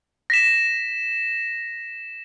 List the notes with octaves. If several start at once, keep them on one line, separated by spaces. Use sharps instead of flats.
A#6 B6 E7